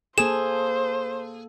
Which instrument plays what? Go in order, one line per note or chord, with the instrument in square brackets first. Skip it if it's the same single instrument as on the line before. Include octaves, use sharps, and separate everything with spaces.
[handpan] A#3 A4 [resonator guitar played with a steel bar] G#4 [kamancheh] C5 [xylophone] E7